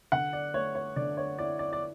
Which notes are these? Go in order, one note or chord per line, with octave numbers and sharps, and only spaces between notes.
D3 F#5
D5
A3 C#5
C#5
D3 D5
C#5
E4 D5
D5
D5